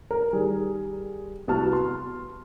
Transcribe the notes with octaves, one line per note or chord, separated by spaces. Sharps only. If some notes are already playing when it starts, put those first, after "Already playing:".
A#4
D#3 G3 G#4
C2 B3 F#4 A5 F6
C6